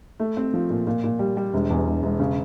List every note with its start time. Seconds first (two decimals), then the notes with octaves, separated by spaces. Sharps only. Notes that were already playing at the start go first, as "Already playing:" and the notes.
0.20 A3
0.37 C4
0.54 F3
0.70 A#2
0.87 A#2
1.04 A#2
1.19 G3
1.37 G3
1.54 E1
1.70 E2
1.86 E1
2.03 E1
2.20 C#3